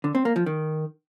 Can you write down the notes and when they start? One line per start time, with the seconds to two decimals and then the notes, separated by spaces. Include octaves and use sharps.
0.04 D3
0.15 C4
0.25 A#3
0.36 F3
0.46 D#3